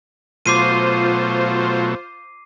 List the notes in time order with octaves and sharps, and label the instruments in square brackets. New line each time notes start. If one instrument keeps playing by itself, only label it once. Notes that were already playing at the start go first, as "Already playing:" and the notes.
[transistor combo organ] B2 F#3 A3 [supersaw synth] F4 C5 [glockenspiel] D6 C7 D#7